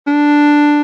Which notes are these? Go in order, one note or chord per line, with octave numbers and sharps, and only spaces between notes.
D4